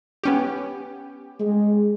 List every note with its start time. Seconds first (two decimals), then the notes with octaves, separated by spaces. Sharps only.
0.23 B3 C#4 G4
1.39 G#3